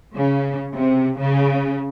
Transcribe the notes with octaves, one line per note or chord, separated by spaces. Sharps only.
C#3
C3
C#3